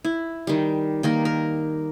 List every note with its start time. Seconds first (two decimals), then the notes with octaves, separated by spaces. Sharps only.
0.05 E4
0.47 D#3 G3
1.03 D#3 A#3 A#4
1.25 A#4